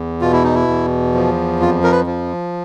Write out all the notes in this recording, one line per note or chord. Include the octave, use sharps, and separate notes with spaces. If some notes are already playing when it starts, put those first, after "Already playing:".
Already playing: E2
B2 F4
E4
D#4
E4
E2
F3
F2 F4
A#4
B4
F3